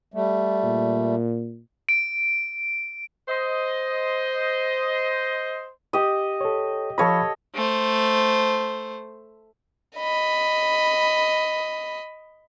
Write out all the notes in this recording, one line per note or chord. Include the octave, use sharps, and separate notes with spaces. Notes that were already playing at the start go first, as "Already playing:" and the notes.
G3 A3
A#2
D7
C5 D#5
G4 D#5
A4 C#5
F3 A4 C#5 D#5 F5 B5
A3 C5
D#5 B5